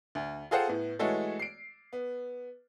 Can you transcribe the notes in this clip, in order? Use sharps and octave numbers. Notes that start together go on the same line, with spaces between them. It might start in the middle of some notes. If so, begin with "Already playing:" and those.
D2
F4 G#4 A4 C5 F#5 G5
A2 B3
E3 G#3 A3 F#4 A4 C#5
C7 D7
B3